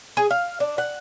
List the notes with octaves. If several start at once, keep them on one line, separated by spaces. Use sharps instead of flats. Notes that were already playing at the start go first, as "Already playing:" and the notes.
G#4
F5
D4
F#5